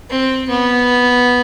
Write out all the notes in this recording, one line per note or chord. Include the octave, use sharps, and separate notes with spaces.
C4
B3